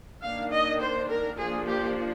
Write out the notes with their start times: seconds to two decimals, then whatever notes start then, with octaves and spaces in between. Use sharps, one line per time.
0.23 D#3 A#3 D4 F5
0.52 D#5
0.81 C5
1.10 A#4
1.38 F3 A#3 D4 G#4
1.67 G4